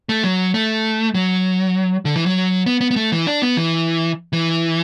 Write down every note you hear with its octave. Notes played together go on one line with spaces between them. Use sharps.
A3
F#3
A3
F#3
D3
E3
F#3
B3
B3
B3
A3
E3
D4
B3
E3
E3